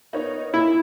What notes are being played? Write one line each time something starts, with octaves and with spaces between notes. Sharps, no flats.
B3 D#4 A#4 C#5
A#2 E4